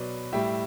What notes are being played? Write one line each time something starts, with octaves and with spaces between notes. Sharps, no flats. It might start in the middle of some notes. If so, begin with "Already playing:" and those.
Already playing: B2 F#3 B4 D5
A2 G3 E5 G5